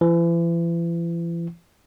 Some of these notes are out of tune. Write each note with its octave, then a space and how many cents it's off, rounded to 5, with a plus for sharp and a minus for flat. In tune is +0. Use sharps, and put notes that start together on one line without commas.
E3 +40